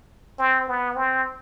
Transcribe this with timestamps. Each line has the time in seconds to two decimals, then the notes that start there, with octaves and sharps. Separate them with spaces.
0.39 C4
0.68 B3
0.96 C4